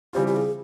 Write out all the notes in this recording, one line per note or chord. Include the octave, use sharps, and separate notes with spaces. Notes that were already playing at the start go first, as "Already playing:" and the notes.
C#3 E3 G3 C4 F4 G4
G4
G#4